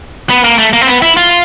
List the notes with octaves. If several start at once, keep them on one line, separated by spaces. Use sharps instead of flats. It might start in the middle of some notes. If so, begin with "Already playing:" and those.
B3
A#3
A3
A#3
C4
B3
E4
F4